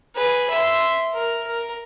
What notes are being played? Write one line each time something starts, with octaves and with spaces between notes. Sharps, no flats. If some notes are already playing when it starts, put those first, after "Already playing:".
G#4 B4
E5 C6
A#4
A#4